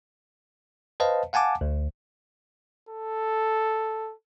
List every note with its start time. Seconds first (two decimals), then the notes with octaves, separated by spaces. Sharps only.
1.00 B4 C5 D#5 F5 A5
1.33 F5 F#5 G#5 A5 D6
1.61 D2
2.89 A4